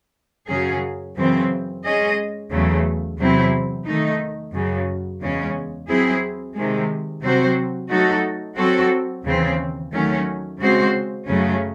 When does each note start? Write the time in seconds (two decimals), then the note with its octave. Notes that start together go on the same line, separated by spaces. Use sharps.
0.49 F#2 C#3 F#3 C#4 G#4
1.16 F#2 C#3 E3 C4
1.84 G#3 C#4 G#4 D#5
2.50 E2 C#3 F#3 A3
3.19 E2 C3 F#3 C4 E4
3.86 D#3 A3 D#4
4.53 F#2 C#3 F#3
5.20 E2 C#3 G#3 C#4
5.88 F#3 C4 E4 G#4
6.55 C3 D#3 G#3
7.23 C3 F#3 C4 F#4 C5
7.90 F#3 A3 D#4 F#4 A4
8.57 F#3 C4 F#4 A4
9.24 D#2 C#3 E3 C4
9.92 D#3 F#3 A3 C#4
10.59 C#3 G#3 C4 F#4 C5
11.26 F#2 C#3 F#3 A3 C#4